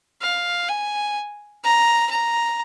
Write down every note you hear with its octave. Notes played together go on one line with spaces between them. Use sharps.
F5
G#5
A#5
A#5